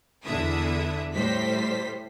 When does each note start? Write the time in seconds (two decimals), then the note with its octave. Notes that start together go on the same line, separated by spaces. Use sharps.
0.24 E2 D3 D4 E4 E5 D#6
1.15 A2 G3 C5 B6